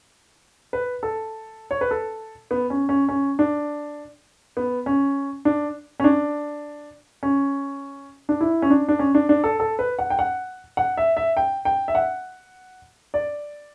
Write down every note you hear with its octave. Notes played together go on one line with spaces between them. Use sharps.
B4
A4
C#5
B4
A4
B3
C#4
C#4
C#4
D4
B3
C#4
D4
C#4
D4
C#4
D4
E4
C#4
D4
D4
C#4
D4
D4
A4
A4
B4
F#5
G5
F#5
F#5
E5
E5
G5
G5
E5
F#5
D5